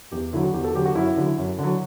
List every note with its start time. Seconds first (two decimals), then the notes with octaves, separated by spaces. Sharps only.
0.12 E2 G4
0.33 D3 F#3 E4
0.44 F#4
0.54 E2 G4
0.64 A4
0.75 D3 F#3 G4
0.85 F#4
0.95 F#2 E4
1.17 D3 F#3
1.38 F#2
1.59 D3 F#3